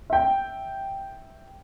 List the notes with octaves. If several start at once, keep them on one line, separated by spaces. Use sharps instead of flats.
E5 G5